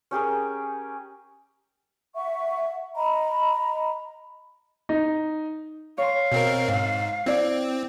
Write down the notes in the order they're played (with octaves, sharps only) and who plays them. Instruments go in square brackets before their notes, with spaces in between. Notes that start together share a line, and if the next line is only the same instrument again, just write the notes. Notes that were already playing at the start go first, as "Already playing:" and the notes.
[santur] C#4 G4 G#4 A#4
[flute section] E5 F#5 C#6
D#5 A#5 B5
[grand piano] D#4
[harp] C#5 C6 [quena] F5
[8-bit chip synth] B2 C4 A#4
G#2
[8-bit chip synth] C4 [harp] E4 D5